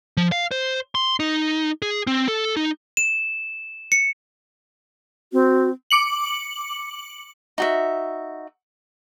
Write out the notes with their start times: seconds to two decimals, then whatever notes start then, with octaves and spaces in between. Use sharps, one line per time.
0.17 F3
0.32 F5
0.51 C5
0.95 C6
1.20 D#4
1.82 G#4
2.07 C4
2.28 A4
2.57 D#4
2.97 E7
3.92 C#7
5.33 C4 F#4
5.90 D6 C#7 F#7
7.58 D#4 F#4 E5